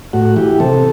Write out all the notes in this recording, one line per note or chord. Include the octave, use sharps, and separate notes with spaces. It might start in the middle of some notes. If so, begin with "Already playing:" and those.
A2 F#4
E3 G4
C3 A4